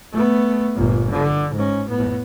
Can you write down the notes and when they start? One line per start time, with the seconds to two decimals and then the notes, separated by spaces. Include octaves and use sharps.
0.12 A3 B3
0.75 G1 A#2
1.10 D3
1.54 G#2 C#4
1.89 A2 B3